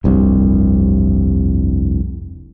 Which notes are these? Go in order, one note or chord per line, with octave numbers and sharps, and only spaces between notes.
F1 C2 G2